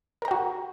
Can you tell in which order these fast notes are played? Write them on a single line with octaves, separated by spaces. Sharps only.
A#4 A#5 G5 F#4